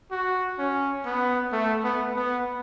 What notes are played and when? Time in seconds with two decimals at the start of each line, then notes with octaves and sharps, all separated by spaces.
0.11 F#4
0.58 C#4
1.06 B3
1.52 A3
1.84 B3
2.16 B3